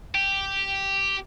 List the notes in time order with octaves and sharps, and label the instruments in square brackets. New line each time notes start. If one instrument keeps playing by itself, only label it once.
[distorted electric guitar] G4